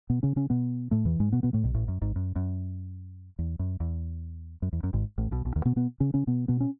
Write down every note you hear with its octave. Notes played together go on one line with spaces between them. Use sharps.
B2 B3
C#3 C#4
C#3 C#4
B2 B3
A2 A3
E2 E3
G#2 G#3
B2 B3
B2 B3
A2 A3
B1 B2
A1 A2
F#2
G#1 G#2
F#2
F#2
E2
F#2
E2
F#2
E2
F#2
G#1 G#2
A1 A2
B1 B2
B1 B2
D#2 D#3
B2 B3
B2 B3
C#3 C#4
C#3 C#4
B2 B3
B2 B3
C#4